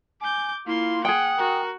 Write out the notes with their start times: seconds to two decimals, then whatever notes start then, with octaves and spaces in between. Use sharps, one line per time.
0.22 G#5 D6 G6
0.67 A#3 E4 F4 C6
1.05 G#4 F#5 G5 D#6
1.38 F#4 A#4